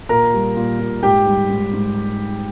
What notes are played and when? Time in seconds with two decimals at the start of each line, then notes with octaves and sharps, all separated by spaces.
0.09 A#2 A#4 A#5
0.33 G3
0.56 A#2
0.79 A#2
1.03 G#2 G4 G5
1.26 G3
1.50 G#2
1.73 G#2